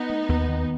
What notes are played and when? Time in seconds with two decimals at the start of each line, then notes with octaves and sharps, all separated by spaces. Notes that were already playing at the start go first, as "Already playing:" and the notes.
Already playing: B3 D#4
0.10 A3
0.29 D#2
0.49 D#3